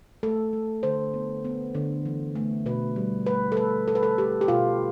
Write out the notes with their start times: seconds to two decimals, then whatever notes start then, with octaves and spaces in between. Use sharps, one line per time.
0.23 A3 A4
0.53 A3
0.83 D3 C5
1.14 B3
1.44 B3
1.75 D3
2.05 E3
2.35 A3
2.66 B2 B4
2.96 G3
3.26 A3 B4
3.52 A4
3.57 A3 B4
3.88 A3 A4
3.95 B4
4.03 A4
4.18 A3 G4
4.41 G4
4.48 B2 F4